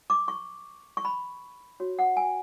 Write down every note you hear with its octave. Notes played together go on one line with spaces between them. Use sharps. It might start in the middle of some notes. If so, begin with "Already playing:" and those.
D6
C#6
C#6
B5
F#4 C#5
F#5
G#5